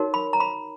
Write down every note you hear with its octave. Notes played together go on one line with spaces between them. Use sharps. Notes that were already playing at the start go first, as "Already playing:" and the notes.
Already playing: D#4 F#4 A#4 C#5
B5
A#5
B5